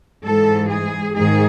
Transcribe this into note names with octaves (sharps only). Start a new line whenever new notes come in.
G#2 E3 G#3 A4
G#4
G#2 D#3 G#4